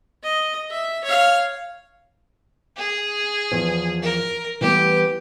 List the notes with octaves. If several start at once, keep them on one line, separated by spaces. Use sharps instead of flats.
D#5
E5
C#5 F5
G#4
E2 F3
A#4
E3 G3 B3 G4